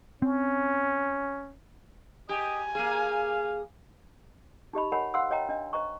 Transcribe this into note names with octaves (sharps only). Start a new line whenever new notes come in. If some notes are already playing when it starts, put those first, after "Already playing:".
C4 C#4
G4 D#5 G#5
A#3 G#4 F5
D#4 G4 D#5 B5
A#4 C#5 D#5 F#5 G#5 B5
C5 F5 F#5 C6 E6
C#5 D#5 G5 A#5
D4 D#5
C5 D#5 A#5 C#6